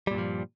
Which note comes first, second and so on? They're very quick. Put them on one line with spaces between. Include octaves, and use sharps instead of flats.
G3 A#2 G2 F3